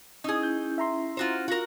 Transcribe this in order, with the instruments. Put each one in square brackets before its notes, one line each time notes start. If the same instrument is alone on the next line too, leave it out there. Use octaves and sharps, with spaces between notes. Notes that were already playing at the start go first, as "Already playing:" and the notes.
[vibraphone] C#4 E4 [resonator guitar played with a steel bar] D#4 G#4
[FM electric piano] G6
E5 A#5 C6
[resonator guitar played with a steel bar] F4 F#4 C5
[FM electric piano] F4 A#6 [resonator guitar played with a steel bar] F#4 A#4